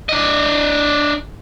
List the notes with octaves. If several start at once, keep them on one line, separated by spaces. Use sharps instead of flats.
D4 D#5